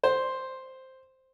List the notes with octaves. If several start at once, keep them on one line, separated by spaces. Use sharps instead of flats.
C5